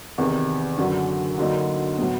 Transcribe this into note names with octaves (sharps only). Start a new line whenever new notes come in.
E2 C3 D#3
F#2 D3 F#3
D2 D3 F#3 A#3 D#4
A2 F#3 B3